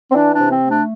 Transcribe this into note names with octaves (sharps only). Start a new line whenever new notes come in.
C4
E3 D4
D4
C3
C4
A3
D4